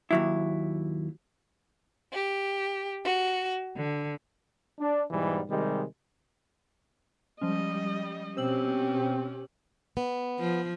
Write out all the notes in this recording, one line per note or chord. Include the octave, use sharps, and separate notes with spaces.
D#2 F#3 E4
G4
F#4
D3
D4
G#2 B2 E3 G3
C3 D#3 G3 G#3
F3 G3 G#3 C#4 D#5
B2 C4 C#4 G4 C5 E6 F#7
B3
F3